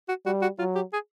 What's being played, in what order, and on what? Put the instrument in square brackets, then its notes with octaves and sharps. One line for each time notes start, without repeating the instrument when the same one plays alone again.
[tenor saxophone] F#4
[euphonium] G3 [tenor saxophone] F#4
[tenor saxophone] F#4
[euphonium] F#3 [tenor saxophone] F4
[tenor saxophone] G4
G#4